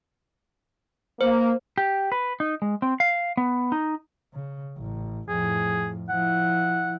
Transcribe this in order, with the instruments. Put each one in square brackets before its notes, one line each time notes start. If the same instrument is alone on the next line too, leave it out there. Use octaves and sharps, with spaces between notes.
[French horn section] A#3 [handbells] C5
[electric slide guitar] G4
B4
D#4
G#3
C4
F5
B3
D#4
[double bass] C#3
A1
[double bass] F2 A2 [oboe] G#4
[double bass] F3 E4 [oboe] F#5